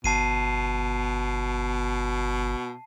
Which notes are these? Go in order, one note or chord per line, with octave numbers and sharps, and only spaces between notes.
G1 B2 A5 C7 D#7